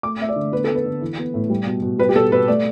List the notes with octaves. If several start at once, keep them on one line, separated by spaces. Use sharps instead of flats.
A3 D6
A3 E5
D5
D3
B3 B4
B3 A4
B4
D3
E3
B3
A2
G3
B2
B2
G3 B4
G4
B2 A4
B2 B4
A3 D5